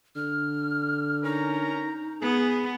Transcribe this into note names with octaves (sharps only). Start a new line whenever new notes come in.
D3 F6
C#4 D#4 A#4 A#5
B3 G#4